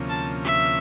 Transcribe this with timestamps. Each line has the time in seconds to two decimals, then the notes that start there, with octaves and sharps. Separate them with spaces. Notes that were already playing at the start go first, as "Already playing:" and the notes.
Already playing: D2 C3 F3 A#3 C#4
0.10 A5
0.45 E5